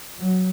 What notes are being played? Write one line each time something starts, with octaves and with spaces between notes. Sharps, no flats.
F#3